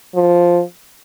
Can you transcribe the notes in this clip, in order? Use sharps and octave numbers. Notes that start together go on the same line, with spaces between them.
F3